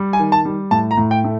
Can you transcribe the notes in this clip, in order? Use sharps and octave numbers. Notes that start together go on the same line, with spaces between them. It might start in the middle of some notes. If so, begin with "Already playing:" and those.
Already playing: G3
G#5
D#3
A5
G3
A2 A5
A#5
A2
G5
A3